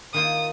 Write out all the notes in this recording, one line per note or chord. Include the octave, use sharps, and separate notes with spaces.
D#3 A#3 F4 D#6